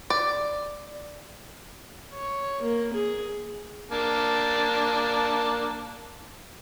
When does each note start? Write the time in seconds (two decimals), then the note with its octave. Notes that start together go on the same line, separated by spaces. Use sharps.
0.10 D5
2.14 C#5
2.62 A#3
2.94 G#4
3.92 A#3 D4 A5